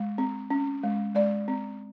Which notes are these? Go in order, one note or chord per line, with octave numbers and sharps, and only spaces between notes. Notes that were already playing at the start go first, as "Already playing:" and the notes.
Already playing: G#3
C4
C#4
G#3
G#3 D5
C4